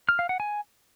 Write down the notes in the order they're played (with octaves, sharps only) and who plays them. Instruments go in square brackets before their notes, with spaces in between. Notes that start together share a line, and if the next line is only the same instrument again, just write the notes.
[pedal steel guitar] F6
F5
F#5
G#5